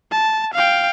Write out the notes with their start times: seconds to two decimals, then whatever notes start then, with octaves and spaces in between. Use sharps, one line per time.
0.11 A5
0.54 F5 G5